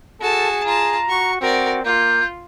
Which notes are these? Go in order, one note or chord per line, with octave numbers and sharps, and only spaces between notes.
F#4 G#4 A4 A5
F4 A5 A#5
F#4 C#6
C4 F#4 A#4 D5
A#3 F4 G6